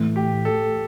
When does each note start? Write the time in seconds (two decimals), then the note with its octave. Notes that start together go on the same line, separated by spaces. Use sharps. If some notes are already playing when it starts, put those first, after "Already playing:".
Already playing: A2 E3 A3
0.16 G4
0.45 A4